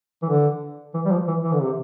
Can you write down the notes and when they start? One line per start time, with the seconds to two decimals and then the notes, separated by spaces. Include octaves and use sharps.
0.22 E3
0.29 D3
0.94 E3
1.05 G3
1.11 F3
1.28 E3
1.43 E3
1.53 D3
1.62 C3